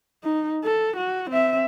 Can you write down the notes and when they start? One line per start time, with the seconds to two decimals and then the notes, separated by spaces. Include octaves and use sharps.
0.24 D#4
0.64 A4
0.97 F#4
1.31 C4 E5